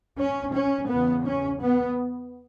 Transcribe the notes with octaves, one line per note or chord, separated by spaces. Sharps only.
C#4
C#4
E2 C#3 B3
C#4
B3